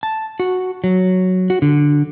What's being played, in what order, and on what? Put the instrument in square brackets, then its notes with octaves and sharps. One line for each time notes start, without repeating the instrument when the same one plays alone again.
[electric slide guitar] A5
F#4
F#3
F#4
D3